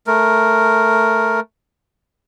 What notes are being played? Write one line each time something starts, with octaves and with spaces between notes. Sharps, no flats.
A3 A#4